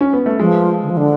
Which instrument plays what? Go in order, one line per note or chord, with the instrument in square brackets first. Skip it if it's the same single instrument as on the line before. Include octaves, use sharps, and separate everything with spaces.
[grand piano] C#4
B3
A3
[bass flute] F3 [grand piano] G#3
[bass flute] D3
F3
D3